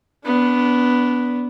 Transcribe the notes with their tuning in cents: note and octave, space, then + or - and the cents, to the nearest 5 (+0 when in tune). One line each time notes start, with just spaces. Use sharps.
B3 +0 D4 -25